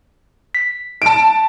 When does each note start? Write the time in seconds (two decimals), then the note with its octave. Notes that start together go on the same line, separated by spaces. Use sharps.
0.55 B6
1.02 A5 D7